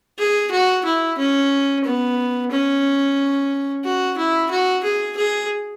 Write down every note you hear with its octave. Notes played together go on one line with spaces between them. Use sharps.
G#4
F#4
E4
C#4
B3
C#4
F#4
E4
F#4
G#4
G#4